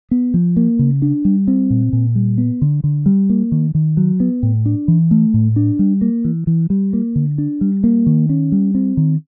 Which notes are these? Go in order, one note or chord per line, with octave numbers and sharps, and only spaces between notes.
B3
F3
A#3
C#3
D4
G3
C4
A#2
A#2
G3
B3
D3
D3
G3
A#3
D#3
D#3
F#3
B3
A2
D4
E3
A3
A2
D4
G3
A#3
E3
E3
G3
A#3
D3
D4
G3
A#3
D#3
C#4
G3
C4
D#3